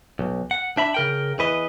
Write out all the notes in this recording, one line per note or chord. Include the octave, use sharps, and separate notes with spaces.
B1
F#5
D4 E5 B5
C#3 A#4 G5
E2 E3 B4 D#5